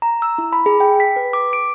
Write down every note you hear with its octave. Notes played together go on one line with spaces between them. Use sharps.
A#5
E6
E4
B5
G#4
G5
B6
B4
D6
D7